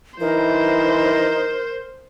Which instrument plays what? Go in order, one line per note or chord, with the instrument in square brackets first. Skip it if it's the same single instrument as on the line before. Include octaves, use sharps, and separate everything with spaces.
[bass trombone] E3 [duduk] D#4 [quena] A#4 [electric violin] C5